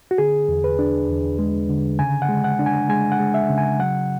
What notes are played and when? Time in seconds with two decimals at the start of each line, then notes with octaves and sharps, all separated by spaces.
0.11 F#4
0.18 D3 G#4
0.49 E2
0.64 B4
0.79 D4
1.09 E2
1.39 G#3
1.69 D3
1.99 C#3 G#5
2.22 F#5
2.29 G#3
2.44 F#5
2.59 D4
2.66 G#5
2.89 G#3 G#5
3.12 F#5
3.20 G#3
3.34 E5
3.50 C#3
3.58 G#5
3.79 F#3 F#5